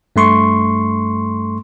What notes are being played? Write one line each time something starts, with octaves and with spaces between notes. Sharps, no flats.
G2 A3 C6 C#6